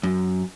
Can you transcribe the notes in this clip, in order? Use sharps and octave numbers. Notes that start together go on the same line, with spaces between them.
F#2